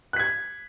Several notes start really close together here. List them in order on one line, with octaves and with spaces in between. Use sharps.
F#6 B6 G#6